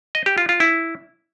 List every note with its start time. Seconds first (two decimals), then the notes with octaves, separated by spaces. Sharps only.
0.15 D#5
0.26 G4
0.38 F4
0.49 F4
0.60 E4